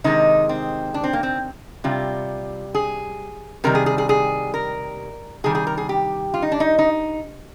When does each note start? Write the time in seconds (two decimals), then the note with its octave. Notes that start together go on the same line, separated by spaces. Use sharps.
0.04 C3 D#3 G#3 D#4
0.49 C4
0.94 D4
1.04 C4
1.13 A#3
1.23 C4
1.84 C3 G3 F4
2.75 G#4
3.64 C3 D#3 G3 A#4
3.75 G#4
3.86 G#4
3.98 G#4
4.09 G#4
4.54 A#4
5.44 C3 D#3 G3 G#4
5.55 G#4
5.67 A#4
5.77 G#4
5.89 G4
6.34 F4
6.42 D#4
6.52 D4
6.60 D#4
6.79 D#4